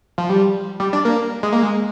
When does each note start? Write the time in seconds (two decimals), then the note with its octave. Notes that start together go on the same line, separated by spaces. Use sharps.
0.18 F3
0.29 G3
0.80 G3
0.93 D4
1.05 A#3
1.43 G#3
1.52 A#3
1.63 G#3